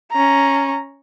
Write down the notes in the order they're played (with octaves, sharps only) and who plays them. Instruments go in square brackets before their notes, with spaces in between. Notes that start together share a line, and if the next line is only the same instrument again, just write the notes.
[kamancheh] C#4 A#5